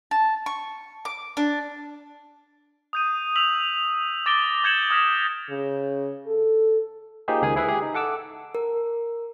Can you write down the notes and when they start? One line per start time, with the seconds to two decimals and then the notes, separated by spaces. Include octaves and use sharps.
0.11 A5
0.46 C#6
1.05 D6
1.37 D4
2.93 D#6 G6 D#7
3.36 E6 B6 F7 F#7
4.26 D6 A6 A#6 D7 G7
4.64 D6 G6 G#6 C#7 E7 F#7
4.90 D#6 F6 A#6 B6
5.50 C#3
6.27 A4
7.28 A#3 D#4 F4 G4 G#4 C5
7.42 C#2 D#3 G#4 A#4 G#5
7.56 E4 G#4 B4 E5
7.68 G4 G#4
7.82 D#4
7.94 A4 F#5 D6 E6
8.55 A#4